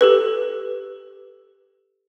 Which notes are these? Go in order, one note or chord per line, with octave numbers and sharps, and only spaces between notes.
G4 A4 B4